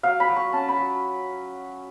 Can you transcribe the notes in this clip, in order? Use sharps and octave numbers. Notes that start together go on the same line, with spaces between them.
F#3 F5
B5
F#3
C#6
C#4 A5
B5
F#3